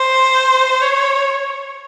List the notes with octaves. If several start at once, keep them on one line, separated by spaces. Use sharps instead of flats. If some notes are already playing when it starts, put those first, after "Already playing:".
Already playing: C5
C#5